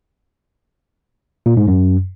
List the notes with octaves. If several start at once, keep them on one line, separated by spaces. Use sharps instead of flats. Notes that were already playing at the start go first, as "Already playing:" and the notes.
A#2
G#2
F#2